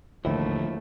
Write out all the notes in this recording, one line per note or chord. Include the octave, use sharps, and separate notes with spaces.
E1 A1 D#2 D3 F3 A3 A#3 E4